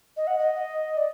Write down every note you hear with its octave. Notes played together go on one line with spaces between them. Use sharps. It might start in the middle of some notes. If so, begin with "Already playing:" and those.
D#5
F#5
D#5
D5